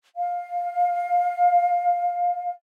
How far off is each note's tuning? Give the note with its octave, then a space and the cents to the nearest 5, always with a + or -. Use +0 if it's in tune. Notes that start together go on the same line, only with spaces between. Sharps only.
F5 +15